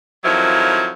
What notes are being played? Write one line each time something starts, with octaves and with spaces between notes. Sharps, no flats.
F2 D#3 F3 F#3 E4